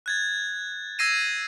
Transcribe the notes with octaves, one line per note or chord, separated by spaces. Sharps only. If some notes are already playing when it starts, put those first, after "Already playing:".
F#6 G#6 A6
E6 G#6 A#6 C7 D#7 E7